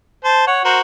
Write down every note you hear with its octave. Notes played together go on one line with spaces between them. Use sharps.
C5 A5
C#5 F#5
F#4 A#4 C5